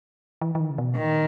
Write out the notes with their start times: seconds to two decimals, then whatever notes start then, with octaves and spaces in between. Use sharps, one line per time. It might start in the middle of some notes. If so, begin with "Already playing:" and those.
0.41 E3
0.55 E3
0.60 D#3
0.70 C#3
0.78 B2
0.96 A#2 D#3